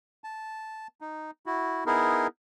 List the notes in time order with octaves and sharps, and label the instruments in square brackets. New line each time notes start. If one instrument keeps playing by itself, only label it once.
[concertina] A5
D#4
E4 F#4
B3 D#4 E4 G#4 A#4